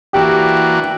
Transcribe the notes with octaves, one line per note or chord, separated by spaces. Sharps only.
E3 A#3 D4 F#4 G4